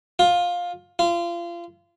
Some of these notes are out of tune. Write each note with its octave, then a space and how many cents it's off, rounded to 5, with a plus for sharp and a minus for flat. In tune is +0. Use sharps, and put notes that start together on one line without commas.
F4 +15
F4 -30